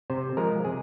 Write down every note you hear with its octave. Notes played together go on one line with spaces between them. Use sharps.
C3 C5
F3 G#3 A#4
C3 G#4